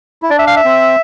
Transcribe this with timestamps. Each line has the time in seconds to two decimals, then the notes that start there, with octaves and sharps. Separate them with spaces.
0.23 E4
0.30 D4 D5
0.39 E5
0.47 F5
0.57 E5
0.65 C4